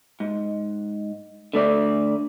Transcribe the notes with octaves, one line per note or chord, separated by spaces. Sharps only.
G#2
D3 A3 D5